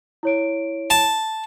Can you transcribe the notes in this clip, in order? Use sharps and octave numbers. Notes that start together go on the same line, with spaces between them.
E4 C#5 D7
A5